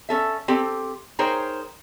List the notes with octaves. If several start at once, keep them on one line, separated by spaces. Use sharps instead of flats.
C#4 A4 E5
C4 G4 A4
D#4 G#4 A#4 C5 C#5 G5